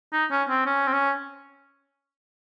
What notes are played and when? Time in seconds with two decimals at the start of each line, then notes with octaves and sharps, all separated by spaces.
0.13 D#4
0.31 C#4
0.49 C4
0.66 C#4
0.87 C4
0.93 C#4